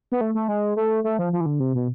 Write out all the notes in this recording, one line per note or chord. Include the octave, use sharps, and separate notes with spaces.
B3
A3
A3
G#3
A3
A3
F3
F3
E3
D3
C3
B2